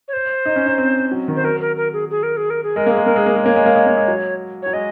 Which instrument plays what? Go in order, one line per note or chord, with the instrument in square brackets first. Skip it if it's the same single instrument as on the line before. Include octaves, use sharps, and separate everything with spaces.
[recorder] C#5
C5
[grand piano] D#4
C#4
D#4
C4
F#3
D#3
[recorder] C5
[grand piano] F#3 [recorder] A#4
[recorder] A#4
A#4
G#4
G#4
A#4
G#4
A#4
G#4
[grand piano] G#3 [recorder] A#4
[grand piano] A#3 [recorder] G#4
[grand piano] G#3
[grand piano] A#3 [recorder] A#4
[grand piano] G#3 [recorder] G#4
[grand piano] A#3
G#3
[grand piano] A#3 [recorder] C#5
[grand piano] G#3
A#3
G#3
A#3
G#3
F#3
[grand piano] F#3 [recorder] C#5
[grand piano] G#3 [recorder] D#5